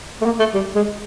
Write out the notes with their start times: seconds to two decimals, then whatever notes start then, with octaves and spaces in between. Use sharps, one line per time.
0.21 A3
0.26 A#3
0.39 A3
0.54 G3
0.75 G#3